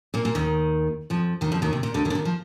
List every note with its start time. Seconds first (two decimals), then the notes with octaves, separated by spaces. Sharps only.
0.14 A#2 A#3
0.25 A#2 A#3
0.35 D#2 D#3
1.10 F2 F3
1.41 D#2 D#3
1.52 F2 F3
1.62 D#2 D#3
1.73 C3
1.83 A#2
1.94 D2 D3
2.05 D#2 D#3
2.10 D3
2.15 D#2 D#3
2.25 F3